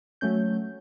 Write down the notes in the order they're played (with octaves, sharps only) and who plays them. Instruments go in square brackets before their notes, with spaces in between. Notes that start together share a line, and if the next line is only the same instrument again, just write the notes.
[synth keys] F#3 A3 C#4 G6